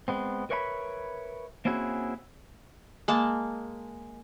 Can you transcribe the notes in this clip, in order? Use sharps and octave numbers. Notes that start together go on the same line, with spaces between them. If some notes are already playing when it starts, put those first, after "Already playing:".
G#3 B3 C4
A#4 B4 C#5 E5 A5 B5
A#3 C4 C#4 E4 F#4 G#4
G#3 A#3 A5